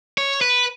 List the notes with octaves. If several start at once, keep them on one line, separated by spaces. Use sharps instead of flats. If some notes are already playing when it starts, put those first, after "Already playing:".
C#5
B4